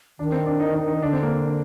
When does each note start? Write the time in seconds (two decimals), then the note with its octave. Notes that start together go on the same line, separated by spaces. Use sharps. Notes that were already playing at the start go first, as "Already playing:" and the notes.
0.19 D#3 D4
0.32 C4
0.46 D4
0.60 D#4
0.74 D#4
0.88 D#4
1.01 D3 D4
1.13 C4
1.23 A#3